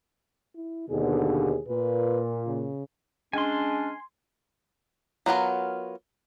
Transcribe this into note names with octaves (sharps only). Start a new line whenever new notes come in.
E4
D#2 B2 D3 G#4
A#2 B4
C#3
G#3 C#4 D4 G#5 C6
F#3 B3 F4 A#4